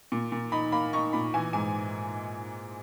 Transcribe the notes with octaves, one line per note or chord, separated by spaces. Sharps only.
A#2
A#2
D#4 B5
A#3 B5
D#4 C#6
A#2 B5
E3 G#5
G#2 G#5